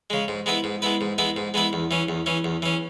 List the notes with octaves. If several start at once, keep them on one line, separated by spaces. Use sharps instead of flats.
C#3 G#3
G#2
G#3 B3 E4 B4
G#2
G#3 B3 E4 B4
G#2
G#3 B3 E4 B4
G#2
G#3 B3 E4 B4
E2
E3 C#4
E2
E3 C#4
E2
E3 C#4